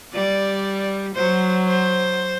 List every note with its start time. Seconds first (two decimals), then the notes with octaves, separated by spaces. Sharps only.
0.13 G3 D5
1.15 F#3 C5
1.67 C5